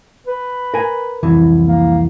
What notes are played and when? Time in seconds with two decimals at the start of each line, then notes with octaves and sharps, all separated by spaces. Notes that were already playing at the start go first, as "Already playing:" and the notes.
0.27 B4
0.74 A#4 G#5
1.23 C2 F2 E3
1.68 A#3